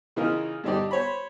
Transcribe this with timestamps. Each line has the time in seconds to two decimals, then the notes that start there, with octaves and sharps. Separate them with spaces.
0.16 C#3 E3 D#4 F4 A#4
0.64 G2 D3 D4 D#4 G4 D5
0.91 C5 C#5 B5